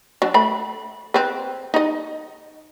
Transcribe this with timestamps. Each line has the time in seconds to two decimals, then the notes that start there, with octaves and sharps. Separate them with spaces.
0.22 F#3 D4
0.34 A3 B5
1.14 C4 B4
1.74 D#4 D#5